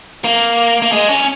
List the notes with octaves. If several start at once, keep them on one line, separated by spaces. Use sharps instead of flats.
A#3
A#3
G#3
C#4